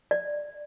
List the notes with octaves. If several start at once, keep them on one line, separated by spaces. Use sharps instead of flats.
D5